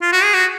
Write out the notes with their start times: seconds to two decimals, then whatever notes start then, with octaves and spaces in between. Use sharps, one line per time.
0.02 F4
0.12 F#4
0.23 G#4
0.34 F#4